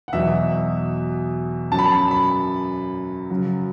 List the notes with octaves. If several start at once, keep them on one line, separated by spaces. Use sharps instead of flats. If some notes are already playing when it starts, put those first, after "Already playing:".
F#5
E2 B2 F#3 E5
F#2 F#3 A5
B5
A5
B5
F#2 C#3 F#3